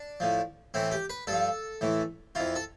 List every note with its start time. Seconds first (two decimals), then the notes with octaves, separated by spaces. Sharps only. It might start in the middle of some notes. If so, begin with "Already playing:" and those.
Already playing: D4
0.20 A2 F3
0.74 A2 E3 C4
0.91 G4
1.10 B4
1.27 G2 A4
1.33 F3
1.81 A2 E3
2.35 F2 E3 F4
2.56 A4